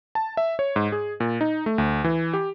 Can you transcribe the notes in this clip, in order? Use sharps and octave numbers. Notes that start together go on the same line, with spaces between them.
A5
E5
C#5
G#2
G#4
A#2
D#4
A3
D2
E3
G4